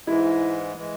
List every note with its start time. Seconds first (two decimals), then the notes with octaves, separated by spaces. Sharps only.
0.07 G#2 E3 G#3 E4
0.77 E3 G#3